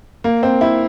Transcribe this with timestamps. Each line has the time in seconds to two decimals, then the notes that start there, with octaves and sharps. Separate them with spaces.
0.24 A#3
0.43 C4
0.61 E4